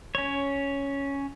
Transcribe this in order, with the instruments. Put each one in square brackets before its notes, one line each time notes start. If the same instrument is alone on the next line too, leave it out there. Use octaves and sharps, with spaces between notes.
[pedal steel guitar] C#4 C#5